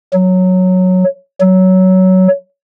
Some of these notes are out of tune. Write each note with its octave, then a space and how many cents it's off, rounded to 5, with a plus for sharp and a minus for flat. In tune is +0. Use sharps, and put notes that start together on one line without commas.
F#3 -5
F#3 +15